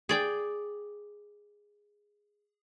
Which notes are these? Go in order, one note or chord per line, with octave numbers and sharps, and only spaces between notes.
G#4 D5 G5